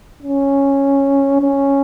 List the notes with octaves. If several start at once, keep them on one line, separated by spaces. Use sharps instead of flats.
C#4
C#4